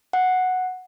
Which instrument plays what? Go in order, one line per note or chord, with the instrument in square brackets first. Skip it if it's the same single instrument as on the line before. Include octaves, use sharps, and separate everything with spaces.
[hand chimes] F#5